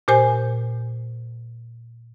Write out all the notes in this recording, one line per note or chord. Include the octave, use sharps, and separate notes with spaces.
A#2 G4 C5 G#5